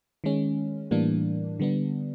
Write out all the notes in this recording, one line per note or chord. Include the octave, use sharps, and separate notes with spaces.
D#3 G#3 C#4
A2 E3 G3 A#3 D4
D3 G3 B3 D4